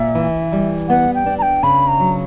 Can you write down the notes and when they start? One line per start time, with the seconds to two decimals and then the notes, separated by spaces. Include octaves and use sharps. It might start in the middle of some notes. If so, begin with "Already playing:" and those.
Already playing: A#2 E5
0.15 E3
0.52 G3
0.89 B3 F#5
1.14 G5
1.26 D4
1.38 A#5
1.42 G5
1.63 C#3 B5
1.88 A#5
2.00 F#3